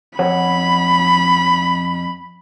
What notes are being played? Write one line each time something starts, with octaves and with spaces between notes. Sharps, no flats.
F2 C#5 F#5 B5